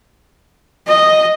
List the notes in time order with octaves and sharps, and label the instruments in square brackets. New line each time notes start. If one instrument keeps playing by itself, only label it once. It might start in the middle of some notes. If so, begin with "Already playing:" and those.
[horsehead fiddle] D#5